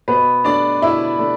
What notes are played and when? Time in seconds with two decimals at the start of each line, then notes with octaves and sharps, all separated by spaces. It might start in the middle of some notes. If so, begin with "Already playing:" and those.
0.08 B2 B3 B4
0.44 A3 D4 D5
0.82 B2 E4 E5
1.19 A3 D4